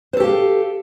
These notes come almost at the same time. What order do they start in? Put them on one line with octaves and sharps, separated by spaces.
C5 A4 G4 F5